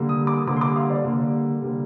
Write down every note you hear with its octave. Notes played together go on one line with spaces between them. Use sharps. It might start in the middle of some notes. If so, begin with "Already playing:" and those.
Already playing: D3 G3 A#3
D#6
D6
D3 G3 A#3 D6
C6
D6
F5
D5
D3 G3 A#3
D3 G3 A#3